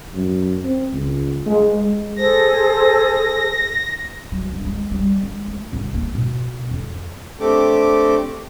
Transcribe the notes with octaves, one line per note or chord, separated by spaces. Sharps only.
F#2
C4
C#2
G#3
G#3
G#4 A4 C5 A#6
F#3
G2
G#3
G3
G#3
A3
C2
A#3
B2
F2
A3 C4 D4 G4 A4 D6